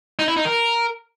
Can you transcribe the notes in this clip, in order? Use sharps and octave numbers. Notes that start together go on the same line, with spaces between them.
D#4
E4
D#4
A#4